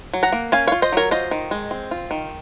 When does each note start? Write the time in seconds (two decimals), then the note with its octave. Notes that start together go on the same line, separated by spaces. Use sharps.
0.14 F#3
0.23 F#5 A#5
0.32 A#3
0.52 C#4 F5 G#5
0.67 F4 C#5 F5
0.82 C5 D#5
0.92 F#3 A#4 C#5
1.11 F4 C5 D#5
1.31 D#3
1.51 G#3
1.71 C4
1.91 F4
2.11 D#3